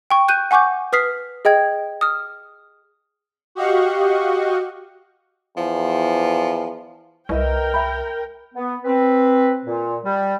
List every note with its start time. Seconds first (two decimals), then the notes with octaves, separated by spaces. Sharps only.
0.11 G5 C#6
0.28 F#6 G6 D#7
0.51 F#5 G#5 C#6 D6 G6
0.93 B4 D#6 F6 B6 C7
1.45 G#4 D#5 G5 G#6
2.01 D#6 F6
3.55 F#4 G4 D#5 F5 F#5 C#6
5.57 E2 F3
7.29 C2 A#4 B4 D#5 E5 G5
7.74 E5 B5
8.55 B3
8.85 C4 B4
9.65 A#2
10.04 G3